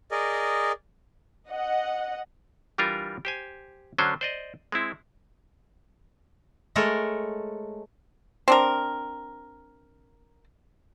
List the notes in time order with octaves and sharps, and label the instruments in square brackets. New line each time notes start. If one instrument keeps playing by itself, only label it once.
[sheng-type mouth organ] G#4 A#4 D5 D#5
[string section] D#5 F#5
[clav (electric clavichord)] E3 G3 D4 F4 G4 A#4
G4 C5 G#5
D3 F#3 C#4 D4 C5
C5 D5 D#5
G#3 C4 E4
[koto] G#3 A3 A4 A#4 C#5
[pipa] C4 D4 A#4